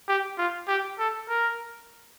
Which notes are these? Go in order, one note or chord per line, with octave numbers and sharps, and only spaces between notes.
G4
F4
G4
A4
A#4